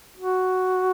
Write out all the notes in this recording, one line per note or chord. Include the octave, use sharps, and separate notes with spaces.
F#4